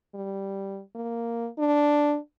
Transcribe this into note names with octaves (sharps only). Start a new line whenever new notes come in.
G3
A#3
D4